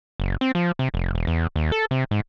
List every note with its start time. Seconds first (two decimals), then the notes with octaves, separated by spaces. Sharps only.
0.20 F#1
0.41 C4
0.55 F3
0.79 C3
0.94 F1
1.15 E1
1.27 E2
1.56 D#2
1.72 A4
1.91 C3
2.11 G#2